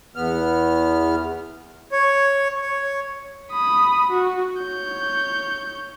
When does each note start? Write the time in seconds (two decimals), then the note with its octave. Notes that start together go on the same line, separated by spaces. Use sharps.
0.16 E2 B3 F6
1.92 C#5
2.61 C#5
3.51 B5 D#6
4.10 F#4
4.62 C#5 G6